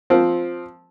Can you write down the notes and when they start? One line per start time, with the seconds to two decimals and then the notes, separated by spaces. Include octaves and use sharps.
0.10 F3 C4